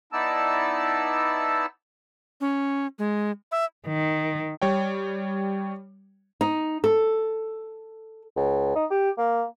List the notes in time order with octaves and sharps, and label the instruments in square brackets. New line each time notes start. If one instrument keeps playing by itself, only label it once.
[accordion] B3 D#4 E4 D5 A5 E6
[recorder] C#4
G#3
E5
[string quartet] D#3
[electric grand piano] G3 C#5 G5
[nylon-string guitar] D#4
A4
[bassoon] C#2
D#4
G4
A#3